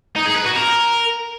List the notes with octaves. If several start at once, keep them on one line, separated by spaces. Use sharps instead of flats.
D#4
G#4
B4
F#4
A#4